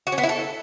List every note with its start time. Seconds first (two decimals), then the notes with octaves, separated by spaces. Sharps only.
0.07 F#4
0.12 C#4
0.18 B3
0.23 E4
0.29 A4